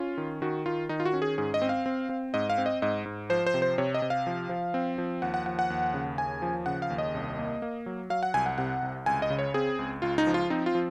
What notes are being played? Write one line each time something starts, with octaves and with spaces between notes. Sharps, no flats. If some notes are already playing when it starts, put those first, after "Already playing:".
Already playing: C#4 F4
D#3
D#3 F#4
D#3 F4
D#3 D#4
F4
F#4
C#4
G#4
G#2 G#4
D#5
C4
F5
C4
C4
G#2 D#5
F5
C4
D#5
G#2 D#5
G#2
F3 C5
C5
C3
C5
C3 C#5
D#5
C3
F5
F3
F3
C4
F3
D#2 F#5
F#5
F3 F#5
F#5
D#2
C#3
D#2 G#5
F3
C#3 F#5
F5
D#2
D#5
C2
A#3
A#3
F#3
F#3 F5
F#5
C2 G#5
F#5
C3 F#5
C2
C#2 G#5
D#5
C#3
C#5
C4 G#4
C#2
C#2 F4
D#4
F3
F4
C4 D#4
F4
F3